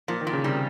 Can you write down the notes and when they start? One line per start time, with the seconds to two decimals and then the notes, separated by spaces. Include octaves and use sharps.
0.08 A#2 F3
0.21 D#3
0.27 A#2
0.33 C#3
0.44 C3 G3